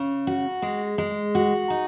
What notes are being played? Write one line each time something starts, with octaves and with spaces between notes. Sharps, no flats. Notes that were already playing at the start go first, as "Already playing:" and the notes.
Already playing: C#3
F#4
G#3
G#3
F#4
D#4